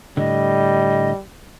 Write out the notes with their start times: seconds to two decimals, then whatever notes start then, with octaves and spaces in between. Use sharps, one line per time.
0.17 A2 D3 G3 D#5